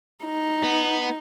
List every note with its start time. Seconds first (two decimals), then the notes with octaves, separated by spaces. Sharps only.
0.25 D#4
0.64 B3